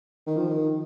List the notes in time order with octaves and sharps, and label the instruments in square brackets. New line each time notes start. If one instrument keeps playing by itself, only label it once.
[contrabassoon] D#3
F3
D#3